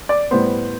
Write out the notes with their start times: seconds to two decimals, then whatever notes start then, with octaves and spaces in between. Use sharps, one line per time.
0.09 D5
0.31 A2 G3 B3 C5